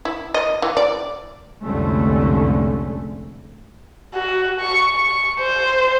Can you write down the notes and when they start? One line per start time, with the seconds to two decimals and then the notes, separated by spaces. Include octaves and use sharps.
0.05 E4
0.34 D#5
0.62 E3
0.77 D5
1.63 F1 C2 D3 G#3 A3 C#4
4.15 F#4
4.61 C#6
4.95 C#6
5.41 C5